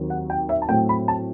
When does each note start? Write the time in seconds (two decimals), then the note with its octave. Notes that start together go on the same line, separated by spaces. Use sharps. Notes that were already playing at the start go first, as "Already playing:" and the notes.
Already playing: D#2 D#3 F#3 C4
0.10 F#5
0.30 G5
0.49 E5
0.62 A5
0.69 A2 F#3 A3 C4 G5
0.89 B5
1.08 A5